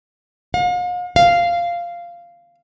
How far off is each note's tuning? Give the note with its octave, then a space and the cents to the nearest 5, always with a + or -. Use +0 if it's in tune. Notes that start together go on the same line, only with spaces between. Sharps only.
F5 +45
F5 -10